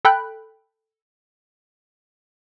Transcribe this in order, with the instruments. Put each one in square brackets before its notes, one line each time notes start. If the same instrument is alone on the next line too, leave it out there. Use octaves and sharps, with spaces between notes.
[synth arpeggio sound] A4 G5 B5 F#6